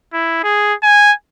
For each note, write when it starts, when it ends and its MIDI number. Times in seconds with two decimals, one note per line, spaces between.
0.13 0.39 64
0.43 0.74 68
0.83 1.12 80